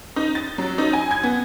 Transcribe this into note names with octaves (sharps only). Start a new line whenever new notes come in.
D#4
A6
F#3
D#4
G#5
G#6
B3